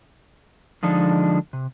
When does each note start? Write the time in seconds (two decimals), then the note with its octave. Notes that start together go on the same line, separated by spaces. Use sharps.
0.83 D3 F3 G#3 D4 D#4
1.53 C3